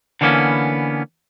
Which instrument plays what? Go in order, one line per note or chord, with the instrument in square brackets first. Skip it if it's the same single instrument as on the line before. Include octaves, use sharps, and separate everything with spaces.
[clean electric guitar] D3 E3 G3 A#3 B3 C#4